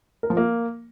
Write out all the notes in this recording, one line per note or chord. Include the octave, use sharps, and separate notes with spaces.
A#4
F3
A#3